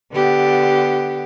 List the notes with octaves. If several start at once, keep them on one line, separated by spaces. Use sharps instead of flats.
D3 B3 G4